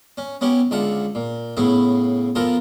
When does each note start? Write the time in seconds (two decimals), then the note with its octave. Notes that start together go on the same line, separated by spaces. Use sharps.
0.18 C#4
0.41 B3 C#4 E4 G4
0.71 C#2 D3 F4 E5 F#5
1.15 A#2
1.57 A2 C#3 B3 E4
2.35 F3 B3 F4 A4 A#4